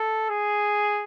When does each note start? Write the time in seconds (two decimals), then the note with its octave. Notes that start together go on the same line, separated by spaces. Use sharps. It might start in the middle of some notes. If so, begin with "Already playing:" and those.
Already playing: A4
0.30 G#4